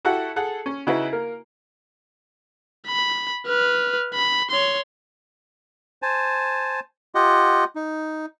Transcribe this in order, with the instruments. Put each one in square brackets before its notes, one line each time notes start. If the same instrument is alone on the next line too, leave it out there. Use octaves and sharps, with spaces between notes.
[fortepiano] E4 F#4 G4 A4 F#5
G#4 A4 F#5
C#4
C#3 D#4 E4 F#4 B4
A#3 A#4
[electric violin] B5
B4 F6
B5
C#5 C6
[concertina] C5 G#5 A5
F4 G4 D#5 F#5
D#4